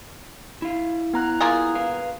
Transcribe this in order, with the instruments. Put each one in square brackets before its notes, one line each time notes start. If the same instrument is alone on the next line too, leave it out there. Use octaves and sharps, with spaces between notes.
[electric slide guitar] E4 F5
[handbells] B3 A#5 F#6
[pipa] A#3 F4 G#4
[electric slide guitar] B4 F5